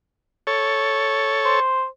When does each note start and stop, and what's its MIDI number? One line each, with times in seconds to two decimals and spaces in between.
0.47 1.60 69
0.47 1.60 73
1.45 1.85 72